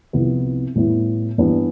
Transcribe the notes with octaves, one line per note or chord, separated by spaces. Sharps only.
C2 C3 F3 B3 E4
A2 G3 B3 E4
G2 E3 G3 B3 D4